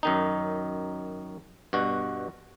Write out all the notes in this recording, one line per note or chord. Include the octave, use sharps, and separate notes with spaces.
F#2 D#3 D#4
G2 B2 F#4